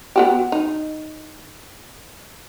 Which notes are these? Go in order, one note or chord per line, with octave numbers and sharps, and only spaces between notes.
B3 F#4 G4
D#4